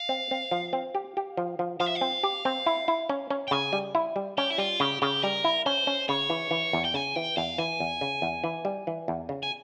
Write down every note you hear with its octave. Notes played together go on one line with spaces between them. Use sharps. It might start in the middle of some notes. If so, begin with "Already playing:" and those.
Already playing: F5
C4
C4
F3
C4
G4
G4
F3
F3
F3 F5
E5
F5
C4
G4
C4
E4
E4
C#4
C#4
G5
C#3 G#5
G3
E4
G3
C#4 G4
E4
G3 F4
C#3 G4
C#3 G4
G3 A#4
E4
C#4 C5
C#4
C#3 C#5
E3
E3
E2
G5
C#3 G#5
E3 G5
E2 F5
E3 G#5
E2
C#3
E2
E3
G3
E3
E2
C#3
G#5